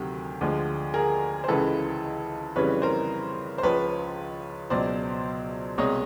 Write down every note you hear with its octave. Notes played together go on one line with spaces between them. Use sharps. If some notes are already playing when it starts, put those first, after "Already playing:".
Already playing: D2 C3 D#3 F#3 G4
D2 D3 F3 G#3
G#4 A#4
C5
C#2 C#3 E3 G#3 A4 B4
F2 C#3 E3 G3 B4 C#5
A#4 C5
C5
C#2 C#3 F3 G#3 B4 C#5
C#2 B2 F#3 C5 D5
C2 B2 G#3 C#5 D#5